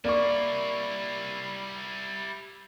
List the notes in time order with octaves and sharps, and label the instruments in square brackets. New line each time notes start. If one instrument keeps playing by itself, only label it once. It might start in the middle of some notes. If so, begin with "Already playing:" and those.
[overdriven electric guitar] G3 E4 [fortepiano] A#3 C#6 [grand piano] D5